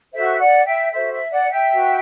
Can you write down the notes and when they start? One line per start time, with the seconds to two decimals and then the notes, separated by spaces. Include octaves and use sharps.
0.12 F#4 A4 C5 E5
0.39 D5 F#5
0.65 E5 G5
0.91 F#4 A4 C5 E5
1.12 E5
1.31 D5 F#5
1.51 E5 G5
1.72 F#4 B4